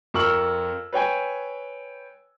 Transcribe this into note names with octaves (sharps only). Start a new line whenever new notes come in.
F2 F4 A#4 C#6 E6 F#7
B4 C#5 G5 G#5